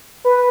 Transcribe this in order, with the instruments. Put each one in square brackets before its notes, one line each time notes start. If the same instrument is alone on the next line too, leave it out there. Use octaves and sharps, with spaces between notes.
[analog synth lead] B4